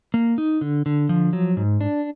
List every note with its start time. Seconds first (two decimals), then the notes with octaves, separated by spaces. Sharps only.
0.14 A#3
0.38 D#4
0.61 D3
0.86 D3
1.09 F3
1.33 F#3
1.57 G#2
1.81 D4